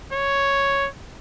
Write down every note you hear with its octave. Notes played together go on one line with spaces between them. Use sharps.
C#5